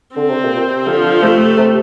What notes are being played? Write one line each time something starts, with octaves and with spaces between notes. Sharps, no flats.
D3 C4
C3
A#2
C3
D3 F3
C3 A3
C3